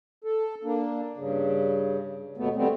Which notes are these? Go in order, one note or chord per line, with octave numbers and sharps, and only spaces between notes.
A4
A#3 D4
G2 C#3
D#2 B2 A3 B3
G3 A3 B3 C4